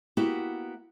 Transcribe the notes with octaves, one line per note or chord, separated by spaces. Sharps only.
A#3 B3 E4 F#4 G4